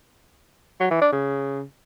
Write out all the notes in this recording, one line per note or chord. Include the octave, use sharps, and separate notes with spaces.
F#3
E3
D4
C#3